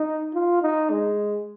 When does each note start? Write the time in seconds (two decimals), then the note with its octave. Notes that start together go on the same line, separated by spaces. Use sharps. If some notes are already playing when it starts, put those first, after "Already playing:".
Already playing: D#4
0.34 F4
0.62 D#4
0.90 G#3